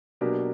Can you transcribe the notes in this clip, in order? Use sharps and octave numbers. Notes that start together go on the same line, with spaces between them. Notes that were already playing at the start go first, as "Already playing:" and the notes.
B2 F#3 A#3 D4 G4